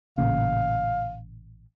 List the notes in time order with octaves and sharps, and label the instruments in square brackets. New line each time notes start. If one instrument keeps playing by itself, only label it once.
[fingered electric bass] A1 A#2 C#3 [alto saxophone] F5